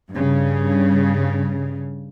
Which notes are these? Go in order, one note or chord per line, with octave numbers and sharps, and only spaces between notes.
G2 C#3